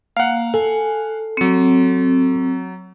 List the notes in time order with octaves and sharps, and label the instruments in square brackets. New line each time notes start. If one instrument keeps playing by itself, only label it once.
[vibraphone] A#3 [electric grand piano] F5 F#5
[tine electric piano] A4 [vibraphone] G#5
[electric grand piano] F#3 C#7 [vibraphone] C4